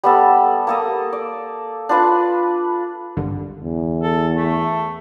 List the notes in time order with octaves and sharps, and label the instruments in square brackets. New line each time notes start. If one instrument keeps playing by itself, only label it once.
[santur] G3 B3 A4
A#3 A4 D#5
D5
D4 F4 B4
[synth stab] G#1 G2 D3
[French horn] E2
[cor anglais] A4
A3